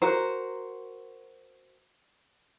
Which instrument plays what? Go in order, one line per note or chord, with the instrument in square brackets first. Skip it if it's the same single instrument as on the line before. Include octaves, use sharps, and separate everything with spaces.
[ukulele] F#4 A#4 C5